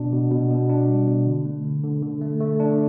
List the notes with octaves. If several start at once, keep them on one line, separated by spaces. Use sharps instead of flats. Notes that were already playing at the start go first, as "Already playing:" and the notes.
Already playing: B2 D4
B2
B2
B2
D4
G3
B2
D3
A3
D3
D3
D3
A3
A3
D4